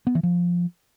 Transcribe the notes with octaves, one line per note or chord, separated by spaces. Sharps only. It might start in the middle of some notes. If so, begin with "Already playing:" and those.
B3
E3
F3